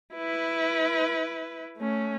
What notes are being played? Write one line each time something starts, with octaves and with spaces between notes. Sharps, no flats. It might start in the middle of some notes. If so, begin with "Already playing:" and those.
E4 B4
A3 C#4